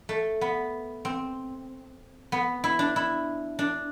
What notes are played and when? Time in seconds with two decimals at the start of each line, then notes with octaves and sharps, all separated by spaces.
0.09 A3
0.41 B3
1.05 C4
2.32 B3
2.64 E4
2.79 D4
2.96 E4
3.59 D4